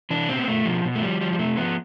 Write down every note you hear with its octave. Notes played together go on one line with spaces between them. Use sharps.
E3 D4
B2 C4
B3
B2 A3
B2 F3
B2
A3
F3 G3
F3 G3
G3
C3 A3
F3 B3